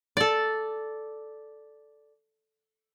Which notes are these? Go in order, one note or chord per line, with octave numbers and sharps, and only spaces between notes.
A4 D5